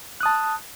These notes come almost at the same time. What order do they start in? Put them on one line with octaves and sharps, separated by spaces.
F#6 D#6 A5